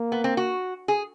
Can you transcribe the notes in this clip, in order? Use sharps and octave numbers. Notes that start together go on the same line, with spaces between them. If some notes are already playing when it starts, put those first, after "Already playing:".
Already playing: A#3
B3
C4
F#4
G#4